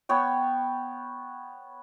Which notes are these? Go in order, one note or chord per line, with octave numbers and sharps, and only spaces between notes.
B3 C#5 G5